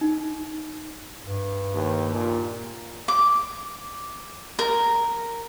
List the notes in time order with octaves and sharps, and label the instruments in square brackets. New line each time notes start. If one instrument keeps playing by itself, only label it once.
[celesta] D#4
[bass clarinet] G2
[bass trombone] D#2
A#2
[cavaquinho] D6
A#4